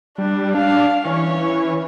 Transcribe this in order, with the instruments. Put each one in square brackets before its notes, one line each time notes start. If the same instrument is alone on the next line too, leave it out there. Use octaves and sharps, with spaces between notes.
[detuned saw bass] G3 [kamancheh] D4
[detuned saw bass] D4 [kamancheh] F5
[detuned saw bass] E3 [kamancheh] C#4 C#5